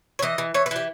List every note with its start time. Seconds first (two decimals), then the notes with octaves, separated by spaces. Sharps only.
0.19 C#5
0.22 E3 D#5
0.38 E3
0.54 E3 C#5
0.66 B4
0.71 E3 G4